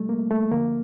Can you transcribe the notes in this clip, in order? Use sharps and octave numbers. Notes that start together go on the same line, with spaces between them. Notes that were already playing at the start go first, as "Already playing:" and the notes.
Already playing: C2 C3 F3 G3 A3
A#3
A3
D2 D3 F3 A#3